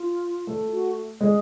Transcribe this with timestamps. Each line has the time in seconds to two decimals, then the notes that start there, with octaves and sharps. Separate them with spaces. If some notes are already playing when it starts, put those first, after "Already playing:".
Already playing: F4
0.47 A3
0.68 F4
0.72 F#4
1.21 G#3 G#4